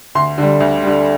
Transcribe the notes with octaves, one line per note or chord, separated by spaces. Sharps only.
D2 C6
D3 G3
D2
D3 G3